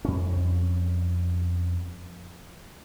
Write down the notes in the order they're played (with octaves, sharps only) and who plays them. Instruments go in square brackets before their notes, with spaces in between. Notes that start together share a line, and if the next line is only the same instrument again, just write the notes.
[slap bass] F2 C#4